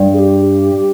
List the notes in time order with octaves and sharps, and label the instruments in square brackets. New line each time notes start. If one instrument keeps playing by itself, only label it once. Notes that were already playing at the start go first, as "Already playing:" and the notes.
Already playing: [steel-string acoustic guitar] G2
[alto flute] G#4
G4